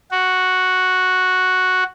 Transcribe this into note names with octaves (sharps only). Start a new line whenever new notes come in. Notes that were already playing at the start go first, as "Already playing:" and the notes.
F#4